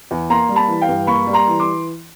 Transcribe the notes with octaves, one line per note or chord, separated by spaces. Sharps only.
E2
A#3 A#5 C6
G3
A5 B5
E3
F5 G5
G2
A#3 B5 C#6
G3
A#5 C6
E3
C6 D6